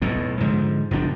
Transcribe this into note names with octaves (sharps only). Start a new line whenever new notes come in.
B1 E2 A2
G#2 D3 F3
F#1 B2 F3 D4